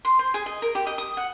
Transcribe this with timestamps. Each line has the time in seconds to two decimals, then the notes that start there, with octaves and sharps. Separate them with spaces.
0.05 C6
0.19 C5
0.34 G#4
0.46 D#5
0.62 A#4
0.75 G4
0.87 D#5
0.98 D#6
1.17 F#5